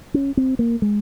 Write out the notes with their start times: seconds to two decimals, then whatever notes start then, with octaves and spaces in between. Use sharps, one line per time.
0.14 C#4
0.37 C4
0.59 A#3
0.82 G#3